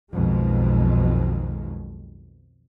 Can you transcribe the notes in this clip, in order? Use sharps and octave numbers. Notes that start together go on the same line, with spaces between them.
B1 F2 B2 D#3 G#3